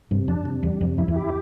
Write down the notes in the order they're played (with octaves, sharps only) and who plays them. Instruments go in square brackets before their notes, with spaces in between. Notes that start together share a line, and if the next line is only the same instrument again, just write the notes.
[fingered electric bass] G2 [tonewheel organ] C3
[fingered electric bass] F2 [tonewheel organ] D4
[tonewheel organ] C3
[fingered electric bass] E2 [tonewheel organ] G3
[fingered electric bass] F2 [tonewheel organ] C3
[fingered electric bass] F2 [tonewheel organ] E4
[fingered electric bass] E2
[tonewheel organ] G4